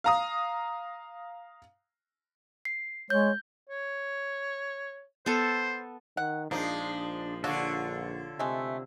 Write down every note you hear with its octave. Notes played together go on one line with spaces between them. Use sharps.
F5 A#5 D#6
C7
G#3 C#5 G6
C#5
B3 A4 C5
D#3 F#5
A#1 F3 G#3 A#3 D4 D#4
D3 D4 F4 F#4 A4 C#5
C3 G#3 A3